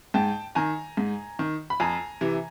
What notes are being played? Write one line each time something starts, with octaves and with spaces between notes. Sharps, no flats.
G#2 G5 A5
D#3 G#5 A#5
G#2
D#3
B5
F2 G#5 A#5
C3 E3